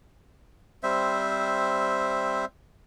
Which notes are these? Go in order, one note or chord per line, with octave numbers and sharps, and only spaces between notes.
G3 C4 C5 E5